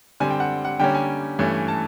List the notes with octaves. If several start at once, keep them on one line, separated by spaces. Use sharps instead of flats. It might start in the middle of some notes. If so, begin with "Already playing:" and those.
D3 G3 C4 G#5
G5
F#5
F#5
D3 G3 A#3 C#4 G5
G#5
G2 E3 A3 C#4
A5